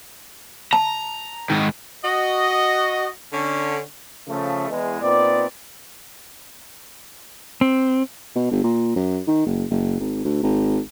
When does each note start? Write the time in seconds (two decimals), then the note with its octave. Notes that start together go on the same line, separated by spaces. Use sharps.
0.73 A5 A#5
1.50 G#2 D#3
2.05 F#4 D#5
3.33 D3 C#4
4.28 C#3 F3 A3
4.69 E2 G#3
5.02 A#2 B3 C4 D#4 D5
7.61 C4
8.35 B2
8.51 G1
8.64 A#2
8.96 F#2
9.27 D#3
9.46 F#1
9.70 F#1
10.00 G#1
10.25 D2
10.43 G#1